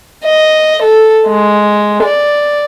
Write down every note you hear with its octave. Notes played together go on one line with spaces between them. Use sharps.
D#5
A4
G#3
D5